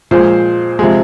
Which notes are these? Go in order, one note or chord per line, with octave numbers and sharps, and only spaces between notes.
A#2 F3 G#3 C5
C3 F3 G#3